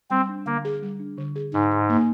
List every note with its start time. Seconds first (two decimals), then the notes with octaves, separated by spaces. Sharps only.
0.11 G3 C4
0.29 D4
0.46 D3 A#3
0.65 G#4
0.83 G3
1.00 D4
1.17 D3
1.36 G#4
1.54 G#2 D#4
1.71 G#4
1.89 A#3